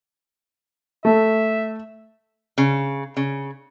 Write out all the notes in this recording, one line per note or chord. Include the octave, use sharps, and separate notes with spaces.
A3 E5
C#3
C#3